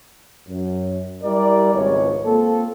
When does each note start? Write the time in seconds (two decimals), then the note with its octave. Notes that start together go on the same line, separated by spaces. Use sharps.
0.48 F#2
1.23 G3 E4 G4 A#4 D5
1.73 G#1 C#2 G#3 B3 C#5
2.25 A#3 C4 F4 A4